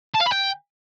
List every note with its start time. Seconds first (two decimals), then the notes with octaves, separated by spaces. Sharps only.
0.14 A5
0.20 F5
0.26 B5
0.32 G5